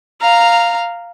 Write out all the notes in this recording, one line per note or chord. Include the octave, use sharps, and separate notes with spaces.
F5 A#5